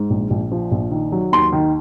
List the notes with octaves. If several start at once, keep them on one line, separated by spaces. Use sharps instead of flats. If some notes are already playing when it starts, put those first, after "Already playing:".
Already playing: G#2
A#1
A#1
F3
A#1
D#3
F#3
D#2 C6
D#3